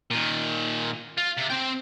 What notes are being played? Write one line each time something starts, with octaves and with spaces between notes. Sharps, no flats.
A#2 D#3
F4
C3
C4 G5